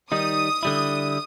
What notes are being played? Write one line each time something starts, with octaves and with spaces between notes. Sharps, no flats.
D#3 G3 D#4 D#6
D3 G3 E4